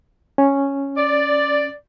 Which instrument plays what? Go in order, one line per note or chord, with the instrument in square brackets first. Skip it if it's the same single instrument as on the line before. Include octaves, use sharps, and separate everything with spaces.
[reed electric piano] C#4
[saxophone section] D5